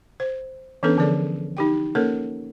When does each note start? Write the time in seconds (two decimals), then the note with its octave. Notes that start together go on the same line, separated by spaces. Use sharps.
0.20 C5
0.83 E3 B3 C#4 D4 A4 B4
0.98 D3 F3 G#4 A#4 D5
1.57 D#4 G4 G5
1.95 A#3 C#4 A4 A#4 C#5